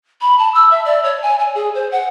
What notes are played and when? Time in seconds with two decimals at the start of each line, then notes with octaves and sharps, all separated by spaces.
0.21 B5
0.39 A5
0.54 E6
0.71 E5
0.85 D5
1.03 C#5
1.22 G#5
1.39 G#5
1.55 G#4
1.75 C5
1.92 F#5